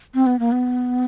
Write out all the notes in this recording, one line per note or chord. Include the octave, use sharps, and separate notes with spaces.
C4
B3
A#3
B3